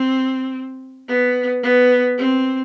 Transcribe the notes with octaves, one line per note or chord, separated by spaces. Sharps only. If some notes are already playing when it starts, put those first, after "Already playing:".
Already playing: C4
B3
B3
C4